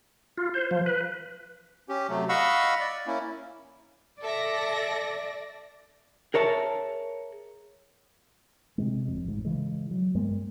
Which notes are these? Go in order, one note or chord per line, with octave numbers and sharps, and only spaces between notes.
F4
C5
F3
B4
C#4 G4
C3 F#3 A3
D#5 F5 F#5 B5 C#6 E6
D5
A#3 C#4 E4
A4 D5 E5 A#6
G#4 A#4 C#5 E5 A5
C3 D#3 G#3
F#1 F2
A1 G#2
C#3 E3 G#3
F#3
G2 G#3 A#3 B3